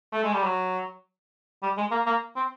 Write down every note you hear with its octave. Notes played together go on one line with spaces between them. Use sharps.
A3
G#3
G3
F#3
G3
G#3
A#3
A#3
C4